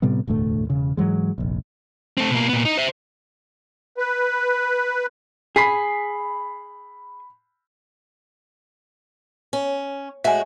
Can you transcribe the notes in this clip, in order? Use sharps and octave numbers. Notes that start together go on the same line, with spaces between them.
A2 C3 G3 B3
E1 D2 A2 A3
E1 C#3
G#2 E3 F#3 G#3
F1 A#1
A3 C4
B2 A#3
A#2 B3
D#4
C5 E5
B4
G#4 B5 B6 C7
C#4
A2 G#3 F#4 E5 G#5